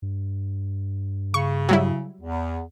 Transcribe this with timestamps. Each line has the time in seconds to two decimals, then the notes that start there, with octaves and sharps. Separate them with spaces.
0.02 G2
1.34 C#3 C#6
1.69 F#3 G3 E4
2.21 E2